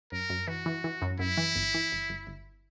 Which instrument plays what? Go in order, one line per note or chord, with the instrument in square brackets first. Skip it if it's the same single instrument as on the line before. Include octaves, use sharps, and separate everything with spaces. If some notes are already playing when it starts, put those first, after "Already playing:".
[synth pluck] F#2 [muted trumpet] A#4
[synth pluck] F#2
[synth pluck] E3 [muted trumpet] F#4
[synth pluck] E3
E3
F#2
[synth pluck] F#2 [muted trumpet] E4
[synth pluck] E3
G1
E3
G1
G1
G1